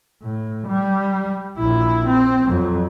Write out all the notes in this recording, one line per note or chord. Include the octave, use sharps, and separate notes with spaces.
A2
G3
A#1 E4
C4
F2 F#3